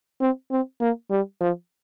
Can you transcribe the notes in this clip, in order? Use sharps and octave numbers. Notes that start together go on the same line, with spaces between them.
C4
C4
A#3
G3
F3